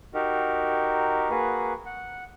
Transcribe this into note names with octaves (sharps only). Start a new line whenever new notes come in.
D#4 F#4 G4 A#4
A#3 F#4 G#4 B4
F#5